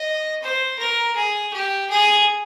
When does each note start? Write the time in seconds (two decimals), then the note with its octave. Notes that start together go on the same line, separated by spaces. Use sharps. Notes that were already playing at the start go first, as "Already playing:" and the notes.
Already playing: D#5
0.43 C5
0.79 A#4
1.16 G#4
1.54 G4
1.90 G#4